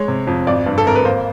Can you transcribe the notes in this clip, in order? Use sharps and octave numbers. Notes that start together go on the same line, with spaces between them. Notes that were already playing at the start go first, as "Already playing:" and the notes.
Already playing: G#3 C#5
C3
F2
G#1 D5
G2
A4
G#1 A#4
B4
A#3 C5